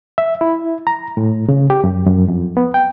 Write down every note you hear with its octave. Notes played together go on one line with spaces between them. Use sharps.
E5
E4
A#5
A2
C#3
G4
F#2
F#2
F2
B3
G5